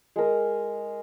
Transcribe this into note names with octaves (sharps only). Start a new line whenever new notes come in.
G#3 A#4